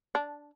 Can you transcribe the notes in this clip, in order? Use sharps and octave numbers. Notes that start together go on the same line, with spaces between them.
D4